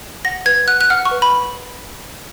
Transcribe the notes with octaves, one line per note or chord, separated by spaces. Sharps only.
F#5 A#6
B4 G#6
F#5 F#6
F#6
F#5 F6
C#6
B4
B5